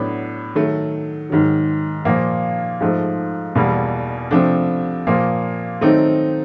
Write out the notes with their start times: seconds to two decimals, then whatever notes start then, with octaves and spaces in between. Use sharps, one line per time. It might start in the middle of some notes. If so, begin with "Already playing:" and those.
Already playing: A2 F#3 B3 D4
0.55 D#3 F#3 A3
1.30 G#2 D#3 F#3
2.05 A#2 F3 A#3
2.81 G#2 F3 A3
3.55 E2 B2 G3 A#3
4.31 C3 F3 A3 D4
5.07 A#2 F3 A#3
5.81 D#3 F#3 A3 C4 D#4